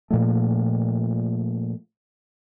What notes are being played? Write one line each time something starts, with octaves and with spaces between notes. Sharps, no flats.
A#2 F3 A3